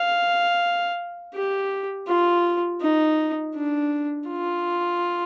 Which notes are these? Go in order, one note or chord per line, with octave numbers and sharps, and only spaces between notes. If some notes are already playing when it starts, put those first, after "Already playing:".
Already playing: F5
G4
F4
D#4
D4
F4